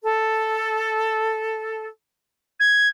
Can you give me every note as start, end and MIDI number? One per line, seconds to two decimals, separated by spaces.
0.03 1.86 69
2.60 2.89 92